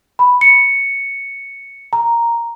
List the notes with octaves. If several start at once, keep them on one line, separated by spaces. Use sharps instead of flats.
B5
C#7
A#5